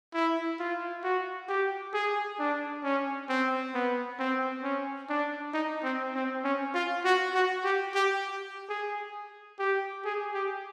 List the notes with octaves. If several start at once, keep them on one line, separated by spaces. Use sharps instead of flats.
E4
F4
F#4
G4
G#4
D4
C#4
C4
B3
C4
C#4
D4
D#4
C4
C4
C#4
F4
F#4
F#4
G4
G4
G#4
G4
G#4
G4